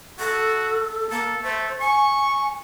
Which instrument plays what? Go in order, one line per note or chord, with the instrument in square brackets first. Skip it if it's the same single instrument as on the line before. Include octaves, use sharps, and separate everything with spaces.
[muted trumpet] F#4 [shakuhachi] A4
[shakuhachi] A#3 [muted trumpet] A4
[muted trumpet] A3 [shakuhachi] C5
[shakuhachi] G#5 [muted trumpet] C#6